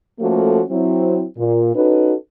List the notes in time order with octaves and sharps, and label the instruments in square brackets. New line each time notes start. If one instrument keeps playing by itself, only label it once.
[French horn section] F3 A3 A#3 C#4 F#4 A4
F#3 C4 E4
A#2
C#4 D#4 F#4 A4 B4